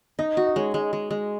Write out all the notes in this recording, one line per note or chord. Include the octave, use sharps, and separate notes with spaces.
D#4 D#5
F#4
D#5
G#3 C#5
G#3
G#3
G#3